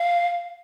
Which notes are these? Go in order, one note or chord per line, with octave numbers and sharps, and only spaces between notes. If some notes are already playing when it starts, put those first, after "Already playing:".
Already playing: F5